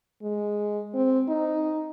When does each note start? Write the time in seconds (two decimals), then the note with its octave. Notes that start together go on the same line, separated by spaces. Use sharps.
0.22 G#3
0.95 C4
1.28 D#4